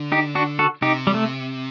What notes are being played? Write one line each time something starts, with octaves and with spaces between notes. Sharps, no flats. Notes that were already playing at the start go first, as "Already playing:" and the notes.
Already playing: D3
D#4 G4
D4 F#4
F#4 A4
C3 D#4 G4
G3
A3